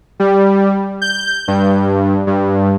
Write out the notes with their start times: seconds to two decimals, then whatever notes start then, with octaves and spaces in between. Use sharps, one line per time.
0.20 G3
1.02 G6
1.48 G2
2.27 G2